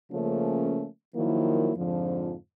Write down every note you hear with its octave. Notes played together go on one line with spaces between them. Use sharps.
C#3 F3 A3 A#3 C#4
D#3 F3 F#3 A#3 E4
F2 G#2 D3 F3